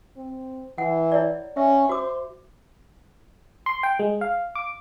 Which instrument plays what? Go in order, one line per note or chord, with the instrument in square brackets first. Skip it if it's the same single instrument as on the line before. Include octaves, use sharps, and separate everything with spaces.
[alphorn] C4
[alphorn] E3 [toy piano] F#5
[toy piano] E4 C#5 D5
[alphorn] C#4 [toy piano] E5
[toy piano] F#4 D6 [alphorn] C5
[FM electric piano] C6
G5
G#3
F5
D6